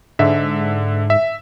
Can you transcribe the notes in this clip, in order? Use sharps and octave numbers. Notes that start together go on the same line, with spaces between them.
G#2 D3 E5
E5